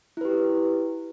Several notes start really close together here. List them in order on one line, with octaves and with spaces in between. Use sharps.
E4 B4 G4